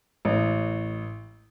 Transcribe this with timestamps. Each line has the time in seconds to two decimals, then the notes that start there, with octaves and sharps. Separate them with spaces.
0.25 A1